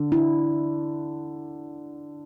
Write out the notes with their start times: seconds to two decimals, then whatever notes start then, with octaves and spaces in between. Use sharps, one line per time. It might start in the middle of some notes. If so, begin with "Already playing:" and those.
Already playing: D3 D4
0.12 E4